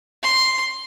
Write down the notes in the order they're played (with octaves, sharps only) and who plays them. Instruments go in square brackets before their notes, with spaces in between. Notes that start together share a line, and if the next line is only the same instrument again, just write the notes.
[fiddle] C6